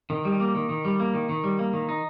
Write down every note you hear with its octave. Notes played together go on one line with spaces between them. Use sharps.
D#3
G3
A#3
D#3
D#3
G3
A#3
D#3
D#3
G3
A#3
D#3
D#4